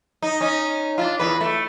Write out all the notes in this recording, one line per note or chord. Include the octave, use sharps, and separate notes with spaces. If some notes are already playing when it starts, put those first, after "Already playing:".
D#4
C#4 D#4
D4 E4 F4
E2 B4
A3